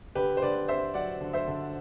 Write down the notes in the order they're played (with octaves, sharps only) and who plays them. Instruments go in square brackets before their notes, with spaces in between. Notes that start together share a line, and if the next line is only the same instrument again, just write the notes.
[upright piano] D3 G4 B4
C5
D3 B4 D5
C4 C5 E5
F#3 D5 F#5
D3
C5 E5
D3